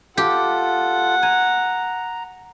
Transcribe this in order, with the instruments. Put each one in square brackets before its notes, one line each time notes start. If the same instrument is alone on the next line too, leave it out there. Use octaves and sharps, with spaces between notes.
[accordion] F4 A4 [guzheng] G4 [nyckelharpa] F#5
[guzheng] G#5 [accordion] A#5